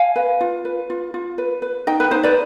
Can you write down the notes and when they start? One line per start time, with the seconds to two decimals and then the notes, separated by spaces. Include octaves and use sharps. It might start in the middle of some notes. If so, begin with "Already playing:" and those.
Already playing: F5 G#5
0.16 B4
0.41 F4
0.65 B4
0.90 F4
1.14 F4
1.38 B4
1.62 B4
1.87 D#4 D#5 G5
2.00 B4
2.11 D#4 C5
2.23 B4 D5